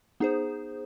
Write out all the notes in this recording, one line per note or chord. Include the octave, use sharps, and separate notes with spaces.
B3 D#4 G#4 C5